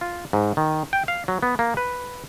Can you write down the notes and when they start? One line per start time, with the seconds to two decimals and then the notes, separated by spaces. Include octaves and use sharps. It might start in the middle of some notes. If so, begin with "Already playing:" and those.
0.01 F4
0.33 G#2
0.57 D#3
0.93 G5
1.08 F5
1.28 F#3
1.43 B3
1.59 A#3
1.77 B4